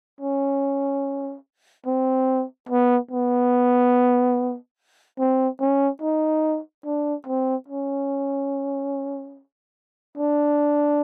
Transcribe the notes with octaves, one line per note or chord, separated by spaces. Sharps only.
C#4
C4
B3
B3
C4
C#4
D#4
D4
C4
C#4
D4